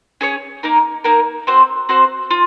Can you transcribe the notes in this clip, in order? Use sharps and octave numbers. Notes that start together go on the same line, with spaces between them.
C#4 G#4 C#5
A#3 D#4 A#4
A#3 D#4 A#4
C4 F#4 C5
C4 F#4 C5
F4